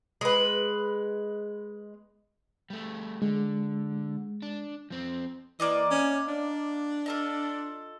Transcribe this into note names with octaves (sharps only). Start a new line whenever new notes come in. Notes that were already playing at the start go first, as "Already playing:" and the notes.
G#3 B4
G3 A3
D3 G#3
D4
F3 C4
E3 A#3 D5 D#5
C#4
D4
F4 A4 D#5